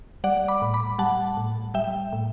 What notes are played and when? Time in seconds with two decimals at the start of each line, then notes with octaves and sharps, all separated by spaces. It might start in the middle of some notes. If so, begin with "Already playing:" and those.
0.24 G3 D5 F#5
0.48 B5 D6
0.62 A2
0.74 B5 D6
0.98 G3 F#5 A5
1.37 A2
1.74 G3 E5 G5
2.13 A2